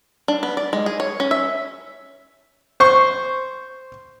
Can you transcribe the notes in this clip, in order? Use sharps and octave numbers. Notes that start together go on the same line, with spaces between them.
D4
B3
D5
G#3
G#4
C#5
C#4
E5
C5 C#6